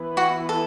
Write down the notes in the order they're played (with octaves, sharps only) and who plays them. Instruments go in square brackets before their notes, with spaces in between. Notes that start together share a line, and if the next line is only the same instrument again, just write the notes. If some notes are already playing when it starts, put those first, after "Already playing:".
Already playing: [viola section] E3 B3 E4 B4
[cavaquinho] F#4
A4